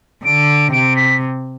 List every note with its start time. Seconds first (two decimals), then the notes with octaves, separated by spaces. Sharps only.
0.25 D3 D7
0.72 C3 D7
0.96 B6